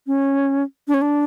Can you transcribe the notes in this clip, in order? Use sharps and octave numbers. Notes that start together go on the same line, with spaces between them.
C#4
D4
C#4
D4